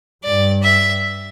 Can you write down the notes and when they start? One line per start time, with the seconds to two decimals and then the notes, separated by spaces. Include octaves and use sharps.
0.24 G2 D5
0.63 E5